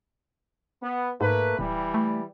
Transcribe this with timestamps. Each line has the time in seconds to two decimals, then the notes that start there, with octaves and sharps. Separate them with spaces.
0.82 B3
1.21 G#2 A3 A#3 B4
1.59 D1 E3 G3
1.94 A3